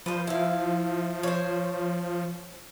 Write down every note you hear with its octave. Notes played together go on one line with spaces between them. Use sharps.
F3 B4 C5
E4 F5
C5 C#5